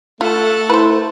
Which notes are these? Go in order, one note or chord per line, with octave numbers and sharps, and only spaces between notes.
A3 F4 A4 F#5
E4 B4 C5